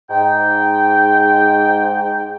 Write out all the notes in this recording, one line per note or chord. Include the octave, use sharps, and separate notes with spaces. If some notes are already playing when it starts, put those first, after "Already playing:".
G#2 G5